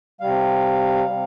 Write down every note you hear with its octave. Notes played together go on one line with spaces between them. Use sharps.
C3 G3 F5
C3 G3